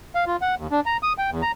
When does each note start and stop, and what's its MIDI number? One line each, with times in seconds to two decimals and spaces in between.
0.15 0.24 77
0.26 0.36 65
0.42 0.55 78
0.58 0.67 39
0.71 0.80 62
0.86 0.97 82
1.03 1.13 87
1.18 1.30 79
1.31 1.42 40
1.42 1.52 82